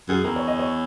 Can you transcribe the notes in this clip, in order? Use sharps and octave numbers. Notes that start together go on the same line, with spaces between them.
F#2 G#4
E2 A#4
C#5
D#5
C#5